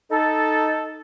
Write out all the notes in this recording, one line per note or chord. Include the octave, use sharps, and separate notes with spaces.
D#4 A4